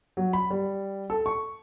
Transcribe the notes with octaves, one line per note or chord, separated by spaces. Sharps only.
F#3
B5
G3
A4
C#6